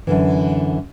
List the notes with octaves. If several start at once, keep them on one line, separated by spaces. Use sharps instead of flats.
F#2 D3 E3